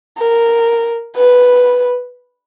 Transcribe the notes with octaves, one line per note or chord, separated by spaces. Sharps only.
A#4
B4